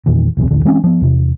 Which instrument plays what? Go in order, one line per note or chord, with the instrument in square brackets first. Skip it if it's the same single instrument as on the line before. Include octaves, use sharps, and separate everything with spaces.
[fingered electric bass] E2 A#2 D#3
F1 B1 E2 C3
A1 D#2 D3
E3 G#3 C4 C#4
F3 B3
E2 C3